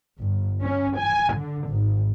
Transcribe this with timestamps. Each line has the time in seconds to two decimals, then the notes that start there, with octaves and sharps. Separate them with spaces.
0.20 G1
0.62 C#4
0.98 G#5
1.34 D3
1.68 G#1